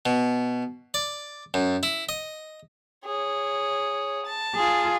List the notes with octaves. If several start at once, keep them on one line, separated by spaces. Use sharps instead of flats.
B2
D5
F#2
E4
D#5
G#4 C#5
A5
F4 G#4